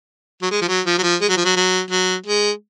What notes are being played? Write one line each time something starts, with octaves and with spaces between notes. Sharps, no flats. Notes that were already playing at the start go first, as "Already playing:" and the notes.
F#3
G#3
F3
F#3
F3
F#3
F3
G#3
F#3
F3
F#3
F#3
F#3
G#3